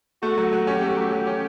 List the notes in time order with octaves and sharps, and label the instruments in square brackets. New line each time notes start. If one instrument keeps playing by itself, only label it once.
[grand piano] A3 [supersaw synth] F#4
[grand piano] F#3
F#3
[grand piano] C#4 [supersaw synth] G4
[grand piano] A3
F#3
F#3
C#4